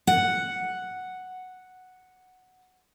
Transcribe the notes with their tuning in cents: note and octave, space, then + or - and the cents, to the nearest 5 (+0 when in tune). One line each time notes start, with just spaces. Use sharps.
F#5 +0